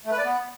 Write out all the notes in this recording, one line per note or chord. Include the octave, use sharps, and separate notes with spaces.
A3
B4
D5
B3